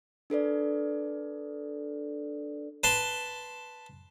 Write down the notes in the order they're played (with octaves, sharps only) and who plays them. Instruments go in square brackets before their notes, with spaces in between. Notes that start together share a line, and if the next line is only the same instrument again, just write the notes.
[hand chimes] D4 A4 B4 D5
[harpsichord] B4 A5 C6